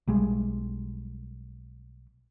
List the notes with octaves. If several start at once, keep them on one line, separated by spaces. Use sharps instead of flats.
B1 G3 G#3